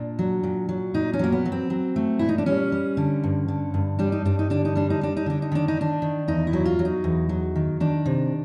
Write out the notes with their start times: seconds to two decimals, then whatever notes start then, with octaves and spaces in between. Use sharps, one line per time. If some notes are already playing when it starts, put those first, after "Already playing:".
Already playing: A#2 D4
0.19 F#3
0.43 A#2
0.69 F#3
0.94 A#2 D#4
1.13 C#4
1.19 F#3 A#3
1.32 B3
1.46 F#3
1.52 C4
1.70 F#3
1.96 A3
2.19 A#2 E4
2.29 D#4
2.38 D4
2.46 G3 C#4
2.72 G3
2.97 D3
3.24 G2
3.48 D3
3.74 G2
3.99 G3 D4
4.12 D#4
4.25 G2 D4
4.39 D#4
4.50 D3 D4
4.65 D#4
4.75 G3 D4
4.90 D#4
5.01 G3 D4
5.17 D#4
5.26 D3 D4
5.42 D#4
5.52 D#3 D4
5.68 D#4
5.77 D#3 D4
6.02 D#3
6.28 E2 D#4
6.47 E4
6.53 F#3
6.65 F4
6.79 F#3
6.85 D#4
7.04 E2
7.29 F#3
7.56 D#3
7.80 D#3 D4
8.06 C3